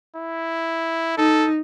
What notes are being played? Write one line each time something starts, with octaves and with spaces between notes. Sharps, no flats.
E4
D#4 A4